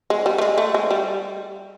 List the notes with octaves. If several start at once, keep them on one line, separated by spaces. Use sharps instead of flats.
G#3
G3
A3
G#3
A3
G#3
G3